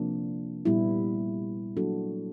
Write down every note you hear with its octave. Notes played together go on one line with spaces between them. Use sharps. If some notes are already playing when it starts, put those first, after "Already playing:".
Already playing: C3 F3 A#3 D4
A#2 G3 B3 E4
F#3 A#3 D4 F#4 A4